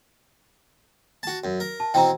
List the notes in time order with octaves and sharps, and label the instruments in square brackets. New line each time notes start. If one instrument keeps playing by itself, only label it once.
[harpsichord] F#4 A5
F#2
A#4
[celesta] A5
[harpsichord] B2 E3 C4 [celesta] G5 A#5